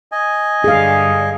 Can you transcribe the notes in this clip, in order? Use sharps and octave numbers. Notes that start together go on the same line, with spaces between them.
D#5 G#5
G2 D3 G#4 F5